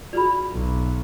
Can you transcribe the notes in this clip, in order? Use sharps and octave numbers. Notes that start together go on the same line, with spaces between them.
F4 F#4 G#4 D5 B5
B1